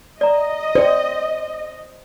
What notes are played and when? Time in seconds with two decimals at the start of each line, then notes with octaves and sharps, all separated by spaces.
0.21 D5 D#5 A#5
0.75 C5 D5 G5